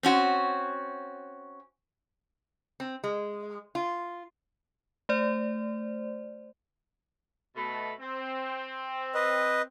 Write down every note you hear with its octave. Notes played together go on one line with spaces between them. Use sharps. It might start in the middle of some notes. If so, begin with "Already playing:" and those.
C4 C#4 F#4
C4
G#3
F4
A3 C5 D5
B2 A3 B5
C4
B4 D#5